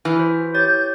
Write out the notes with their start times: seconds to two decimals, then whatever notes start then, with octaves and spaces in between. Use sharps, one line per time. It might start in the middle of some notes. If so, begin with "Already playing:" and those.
0.05 E3 E4 G#5 F6
0.18 F#4 C5
0.54 G4 C#5 G6 A6